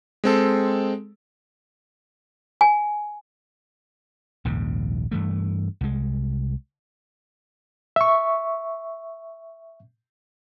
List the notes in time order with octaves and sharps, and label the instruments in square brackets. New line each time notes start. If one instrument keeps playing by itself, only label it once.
[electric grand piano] G#3 C4 A4
[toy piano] G#5
[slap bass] A#1 D#2 G#2 C#3
G2 E3 A3
C2 G#3
[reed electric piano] E5 C#6